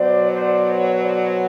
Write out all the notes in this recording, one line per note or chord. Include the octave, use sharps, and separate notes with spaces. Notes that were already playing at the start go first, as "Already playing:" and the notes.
Already playing: B2 F#3 B3 C5 D5
C5 D5
B4 C#5
C5 D5